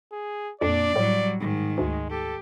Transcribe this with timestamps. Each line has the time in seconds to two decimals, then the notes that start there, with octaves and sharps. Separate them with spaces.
0.12 G#4
0.61 F2 A#2 D4 D5
0.96 A2 F#3 G3
1.40 G#2 D#3
1.78 D2 G#3
2.10 G4 A4